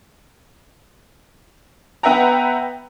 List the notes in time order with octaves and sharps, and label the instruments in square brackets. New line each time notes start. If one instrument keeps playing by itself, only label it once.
[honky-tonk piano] B3 B4 E5 F#5 G5 A#5